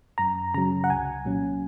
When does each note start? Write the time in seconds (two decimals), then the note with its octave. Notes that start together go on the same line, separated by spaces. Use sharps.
0.18 F#2 A#5
0.54 C#3 F#3 A#5
0.84 F#5
0.89 C2 G#5
1.25 A#2 F#3 C#4